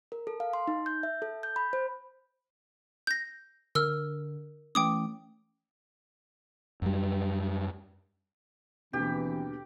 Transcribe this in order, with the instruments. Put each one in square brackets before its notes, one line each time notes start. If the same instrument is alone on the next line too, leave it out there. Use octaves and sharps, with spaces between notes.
[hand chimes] A#4
A4
F5
C6
D#4
G6
E5
A4
G6
B5
C5
[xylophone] G6 A#6
[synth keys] D3 [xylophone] A#4 E6 F6
[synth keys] E3 A3 C#4 [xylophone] G5 D6 D#6
[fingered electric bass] F#2 G3
[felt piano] D#2 B2 D3 [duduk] E3 [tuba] C4 [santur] G4